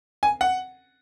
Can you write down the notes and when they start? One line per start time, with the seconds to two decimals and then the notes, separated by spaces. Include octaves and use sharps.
0.23 G#5
0.41 F#5